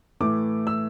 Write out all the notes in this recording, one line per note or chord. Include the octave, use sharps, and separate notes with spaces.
A2 E3 A3 D6
E6